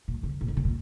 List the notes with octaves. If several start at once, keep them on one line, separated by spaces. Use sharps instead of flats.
A#2
C#3
A#2
D#3
C#3
A#2